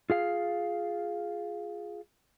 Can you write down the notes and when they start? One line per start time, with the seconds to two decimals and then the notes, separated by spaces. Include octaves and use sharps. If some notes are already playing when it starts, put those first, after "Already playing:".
0.10 F4 G#4 F5